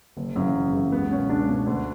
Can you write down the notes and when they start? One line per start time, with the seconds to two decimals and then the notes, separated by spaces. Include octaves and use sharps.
0.17 F#1
0.36 F#2 C#3 E3
0.54 F#1
0.73 F#2 C#3 E3
0.92 C#2 B3
1.11 B2 C#4
1.29 C#2 D4
1.48 B2
1.67 D2